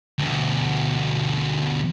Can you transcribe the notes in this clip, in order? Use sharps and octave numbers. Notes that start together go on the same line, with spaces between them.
D2 B2